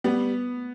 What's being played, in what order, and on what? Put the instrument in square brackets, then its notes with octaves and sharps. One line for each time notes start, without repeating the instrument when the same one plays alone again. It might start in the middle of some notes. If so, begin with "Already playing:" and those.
[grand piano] G3 [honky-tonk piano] B3